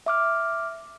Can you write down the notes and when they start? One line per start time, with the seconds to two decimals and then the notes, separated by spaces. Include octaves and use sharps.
0.06 E5 D6 F6